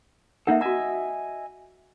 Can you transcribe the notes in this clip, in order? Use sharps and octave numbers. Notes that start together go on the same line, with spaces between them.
A#3 D#4 A4 E5 F#5
F#4 D#5 E5 G#5 A#5